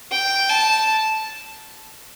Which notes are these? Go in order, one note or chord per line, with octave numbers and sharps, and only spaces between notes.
G5
A5